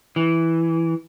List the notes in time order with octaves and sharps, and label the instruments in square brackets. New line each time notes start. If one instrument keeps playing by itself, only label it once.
[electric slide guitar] E3